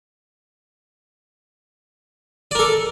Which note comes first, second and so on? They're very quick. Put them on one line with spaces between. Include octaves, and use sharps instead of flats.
D5 A#4 A4